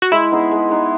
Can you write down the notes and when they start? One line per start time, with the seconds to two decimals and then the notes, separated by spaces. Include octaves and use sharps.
0.02 F#4
0.11 G#3 E4
0.32 B3 D#4 G#4
0.51 G#3
0.71 B3 D#4 G#4